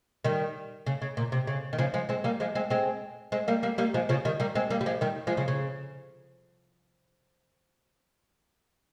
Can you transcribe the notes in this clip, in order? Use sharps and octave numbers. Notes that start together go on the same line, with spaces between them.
D#3 G3
C#3
C#3
A#2
C3
C#3
D#3
C#3 F3
F3 G#3
G#3 C4
G3 A#3
F3 G#3
G#3 C4
G#3 C4
G#3 C4
G3 A#3
G3 A#3
G3 A#3
F3 G#3
C#3 F3
D#3 G3
G3 A#3
G#3 C4
G3 A#3
G3
F3 G#3
D#3 G3
F3 G#3
C#3 F3
C#3